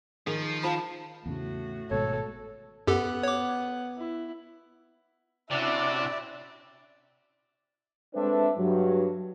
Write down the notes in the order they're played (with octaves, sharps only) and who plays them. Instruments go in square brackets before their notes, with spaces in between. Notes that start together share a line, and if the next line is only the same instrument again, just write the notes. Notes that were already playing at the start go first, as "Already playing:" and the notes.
[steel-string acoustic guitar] D#3 [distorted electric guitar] F3 [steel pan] G#4
[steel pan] F4 C5 B5 [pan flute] A5
[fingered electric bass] E2 C#3 [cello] A2 F#4
[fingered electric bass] G#1 B2 G#3 [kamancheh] A4 [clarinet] C#5
[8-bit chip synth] F#2 G4 A4 [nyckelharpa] B3 F#5
[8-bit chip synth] C#5 D6
[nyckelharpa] E4
[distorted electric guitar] C3 [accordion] C#4 D4 F#4 [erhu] E4 [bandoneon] D5
[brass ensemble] G#3 C4 D4 A4 B4 E5
G2 F#3